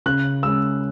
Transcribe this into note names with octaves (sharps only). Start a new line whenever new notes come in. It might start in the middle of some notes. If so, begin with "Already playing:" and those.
C#3 F#6
G#3 C#4 E6